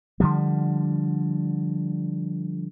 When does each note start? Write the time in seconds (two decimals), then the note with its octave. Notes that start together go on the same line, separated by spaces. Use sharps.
0.20 D3 F3 G3